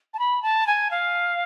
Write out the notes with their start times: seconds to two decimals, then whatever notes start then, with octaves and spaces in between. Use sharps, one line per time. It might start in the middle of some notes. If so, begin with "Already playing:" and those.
0.14 A5
0.19 B5
0.42 A5
0.67 G#5
0.91 F5